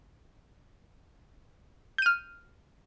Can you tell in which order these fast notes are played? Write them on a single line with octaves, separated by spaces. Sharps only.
G6 D#7 F6